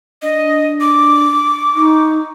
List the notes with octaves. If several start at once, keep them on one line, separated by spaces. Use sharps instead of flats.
D4 D#5
D6
C#6
D#4